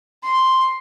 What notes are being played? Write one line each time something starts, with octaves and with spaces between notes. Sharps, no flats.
C6